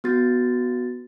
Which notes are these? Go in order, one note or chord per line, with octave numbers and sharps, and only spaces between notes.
B3 F#4 A6